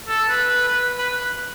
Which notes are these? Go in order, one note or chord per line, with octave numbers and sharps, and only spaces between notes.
A4
B4
B4
B4
B4